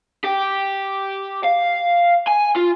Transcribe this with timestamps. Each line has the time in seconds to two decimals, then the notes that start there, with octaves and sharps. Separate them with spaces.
0.24 G4
1.44 F5
2.28 G#5
2.56 F4